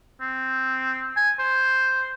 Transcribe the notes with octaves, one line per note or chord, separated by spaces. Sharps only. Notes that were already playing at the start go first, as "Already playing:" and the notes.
C4
G#5
C5